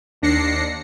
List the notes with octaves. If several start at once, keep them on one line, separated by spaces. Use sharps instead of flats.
D#2 D4 A#6 C7 C#7